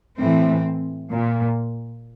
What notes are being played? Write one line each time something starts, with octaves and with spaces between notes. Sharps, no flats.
A2 E3 C4
A#2